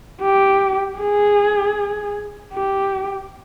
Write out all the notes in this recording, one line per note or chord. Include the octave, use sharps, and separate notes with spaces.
G4
G#4
G4